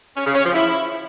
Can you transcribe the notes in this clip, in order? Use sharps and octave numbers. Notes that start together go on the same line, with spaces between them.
C#4
C#3
C#4
F3
E4